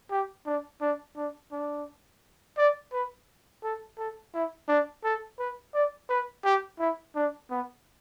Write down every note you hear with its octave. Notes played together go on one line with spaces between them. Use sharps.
G4
D4
D4
D4
D4
D5
B4
A4
A4
E4
D4
A4
B4
D5
B4
G4
E4
D4
B3